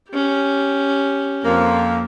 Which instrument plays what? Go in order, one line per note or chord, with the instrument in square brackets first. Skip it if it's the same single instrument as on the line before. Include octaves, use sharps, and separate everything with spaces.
[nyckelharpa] C#4 G4
[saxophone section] F2 A#3